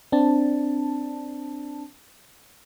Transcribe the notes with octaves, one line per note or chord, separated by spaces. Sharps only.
C4 D4 A5